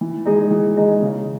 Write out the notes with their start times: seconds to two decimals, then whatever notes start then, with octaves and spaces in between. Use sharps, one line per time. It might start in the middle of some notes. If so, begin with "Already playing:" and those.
0.01 E3
0.25 G#3 D#4 G#4 D#5
0.51 E3
0.77 G#3 D#4 G#4 D#5
1.02 C#3